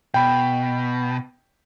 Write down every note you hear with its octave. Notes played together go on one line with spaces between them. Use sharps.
B2 G5 B5